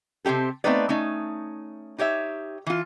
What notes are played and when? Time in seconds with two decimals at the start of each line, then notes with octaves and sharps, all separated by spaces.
0.25 C3 C4 D#4 G4 A4
0.64 A3 B3 C4 D#4 B4 D5
0.89 A3 C#4 D#4
1.98 D#4 G4 C#5 E5
2.66 E3 F4